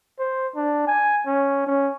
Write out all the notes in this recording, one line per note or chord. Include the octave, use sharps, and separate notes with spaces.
C5
D4
G#5
C#4
C#4